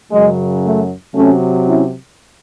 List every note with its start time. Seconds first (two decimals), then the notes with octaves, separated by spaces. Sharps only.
0.11 F#2 C#3 F#3 G#3
0.63 A3
1.14 C3 F#3 A3 C#4
1.65 C#4 E4